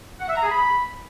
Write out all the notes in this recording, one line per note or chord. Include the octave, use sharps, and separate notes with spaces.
F#5
E5
A#5
G#4
B5